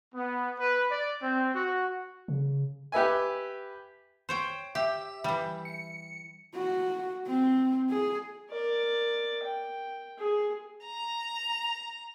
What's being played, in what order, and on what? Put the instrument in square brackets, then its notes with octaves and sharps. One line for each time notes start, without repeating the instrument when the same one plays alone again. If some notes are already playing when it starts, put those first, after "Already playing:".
[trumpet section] B3
B4
D5
C4
F#4
[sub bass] C#3
[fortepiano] G4 B4 E5 G#5
[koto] C5 C#5 G5
[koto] G4 [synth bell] E5
[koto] E3 G3
[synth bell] C#7
[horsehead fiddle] F#4
C4
G#4
[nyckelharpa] A#4 D5
G5
G#4
[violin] A#5